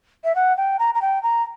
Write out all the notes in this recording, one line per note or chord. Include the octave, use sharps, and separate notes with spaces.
E5
F#5
G5
A#5
A#5
G5
A#5